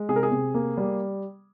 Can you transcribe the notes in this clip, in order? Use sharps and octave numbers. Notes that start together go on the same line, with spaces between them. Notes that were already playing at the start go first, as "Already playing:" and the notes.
Already playing: G#3
C3 G#4
A#4
G#4
C3
A#3
G3